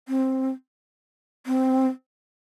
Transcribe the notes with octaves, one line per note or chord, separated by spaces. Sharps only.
C4
C4